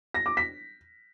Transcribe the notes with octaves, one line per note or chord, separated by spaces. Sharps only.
A#6
D6
B6